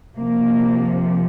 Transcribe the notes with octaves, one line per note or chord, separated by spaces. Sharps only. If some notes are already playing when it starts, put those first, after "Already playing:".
C3 F3 A#3